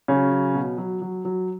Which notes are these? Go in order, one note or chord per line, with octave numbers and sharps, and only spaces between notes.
C#3 F#3 C#4
F#3
B2
F#3
F#3
F#3